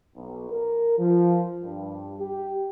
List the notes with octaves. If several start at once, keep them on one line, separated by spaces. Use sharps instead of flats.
B1
A#4
F3
G2
G4